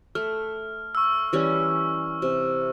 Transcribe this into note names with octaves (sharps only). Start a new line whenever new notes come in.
A3 F6
C#6 E6
E3 G3 C#4
C3